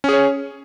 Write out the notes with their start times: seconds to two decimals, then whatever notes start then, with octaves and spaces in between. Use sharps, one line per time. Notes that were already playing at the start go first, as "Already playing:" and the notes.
0.04 C#4
0.09 G#4
0.13 C#5